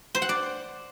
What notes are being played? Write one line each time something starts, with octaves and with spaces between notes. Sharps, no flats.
C5
F#5
D5